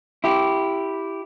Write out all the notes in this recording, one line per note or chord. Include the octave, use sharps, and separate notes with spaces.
E4 G4